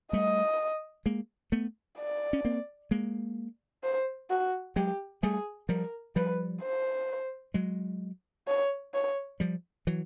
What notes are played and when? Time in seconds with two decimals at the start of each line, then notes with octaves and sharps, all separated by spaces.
0.13 G3 A3 D#5
1.06 G#3 A#3
1.52 A3 B3
1.98 D5
2.33 C#4
2.45 A#3 C4
2.91 G#3 A#3
3.84 C5
4.30 F#4
4.76 F#3 G#3 G4
5.23 G3 A3 G#4
5.69 F3 G3 A#4
6.16 F3 G3 B4
6.62 C5
7.54 F#3 G#3
8.48 C#5
8.94 C#5
9.40 F3 G3
9.87 E3 F#3